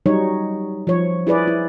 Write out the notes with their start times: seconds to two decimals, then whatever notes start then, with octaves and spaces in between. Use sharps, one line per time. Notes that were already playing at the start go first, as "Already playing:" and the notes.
0.06 F#3 G3 D#4 C#5
0.87 F3 C#5
1.27 E4 G#4 B4 D5
1.47 E4